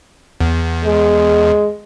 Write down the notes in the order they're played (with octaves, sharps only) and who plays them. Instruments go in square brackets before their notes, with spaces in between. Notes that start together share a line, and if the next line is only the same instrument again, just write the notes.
[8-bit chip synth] E2
[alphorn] G#3